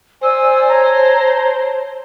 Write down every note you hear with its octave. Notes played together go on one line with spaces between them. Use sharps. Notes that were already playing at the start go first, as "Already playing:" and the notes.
C5 D5 G#5 E6
C#5 A5 A#5